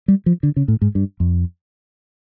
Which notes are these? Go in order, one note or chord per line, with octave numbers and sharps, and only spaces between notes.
G3
F3
D3
C#3
A2
G#2
G2
F2